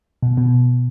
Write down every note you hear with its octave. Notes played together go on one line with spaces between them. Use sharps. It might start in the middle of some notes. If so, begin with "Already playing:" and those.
B2
B2